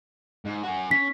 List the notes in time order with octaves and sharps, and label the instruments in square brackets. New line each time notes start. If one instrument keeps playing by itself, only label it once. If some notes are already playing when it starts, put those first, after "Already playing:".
[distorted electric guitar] G#2
F#4 G#5
[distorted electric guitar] C#4 [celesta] B6